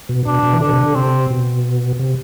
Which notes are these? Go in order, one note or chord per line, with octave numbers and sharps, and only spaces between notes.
B2
B2 D4
B2
E3
D3 D4
B2
C3
D3
C3 C4
B2
C3